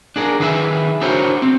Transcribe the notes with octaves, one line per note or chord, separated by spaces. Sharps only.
D4 G#4 A#4
D#3 G#4 B4 E5
D4 E4 F#4 A#4 C5 C#5
C4